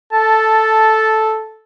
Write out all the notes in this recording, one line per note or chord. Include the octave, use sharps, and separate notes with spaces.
A4 A5